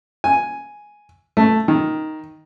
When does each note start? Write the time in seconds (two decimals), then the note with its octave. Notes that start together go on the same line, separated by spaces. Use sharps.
0.24 G#5
1.37 A3
1.68 D#3